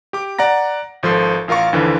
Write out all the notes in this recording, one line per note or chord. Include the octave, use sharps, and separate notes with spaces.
G4 D6
D5 F#5 A#5 A#6
G#1 F3 A4 C6
A1 F4 A#4 F5 C#6
D#2 D3 E3 F3